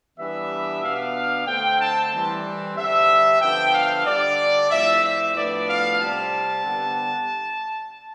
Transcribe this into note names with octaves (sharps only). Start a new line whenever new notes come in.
E3 G3 B3 D4 E5
B2 B3 D4 F5
D3 A3 C4 G5
A5
E3 G3 C4
D3 G3 C4 E5
D3 F3 B3 D4 G5
F5
D3 G3 D4 D5
A2 F3 C4 E5
E5
A2 F3 B3 D4 D5
F5
C3 G3 C4 A5
D3 G3 B3 D4